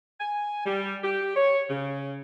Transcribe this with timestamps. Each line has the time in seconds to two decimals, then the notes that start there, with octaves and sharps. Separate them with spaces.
0.20 G#5
0.66 G3
1.03 G4
1.36 C#5
1.70 C#3